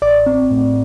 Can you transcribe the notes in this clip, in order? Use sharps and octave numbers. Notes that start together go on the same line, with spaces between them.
A1 D5
C4
A2